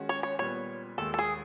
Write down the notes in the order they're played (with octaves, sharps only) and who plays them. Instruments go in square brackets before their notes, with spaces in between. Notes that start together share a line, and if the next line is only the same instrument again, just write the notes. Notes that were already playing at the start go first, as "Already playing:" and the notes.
Already playing: [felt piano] D#3 G#3 C#4 F#4
[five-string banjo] C#5
C#5
[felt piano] A#2 G3 B3 [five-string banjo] C#5
[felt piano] D#2 D#3 G#3 [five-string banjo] A4
[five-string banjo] A4
G#4